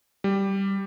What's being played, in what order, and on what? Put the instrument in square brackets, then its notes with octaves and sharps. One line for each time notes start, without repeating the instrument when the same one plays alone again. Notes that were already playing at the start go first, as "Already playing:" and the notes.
[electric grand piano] G3